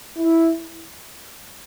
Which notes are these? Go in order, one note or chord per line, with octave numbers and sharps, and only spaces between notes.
E4